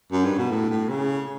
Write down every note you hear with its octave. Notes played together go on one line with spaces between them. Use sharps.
F#2
G2
B2
A2
A2
C#3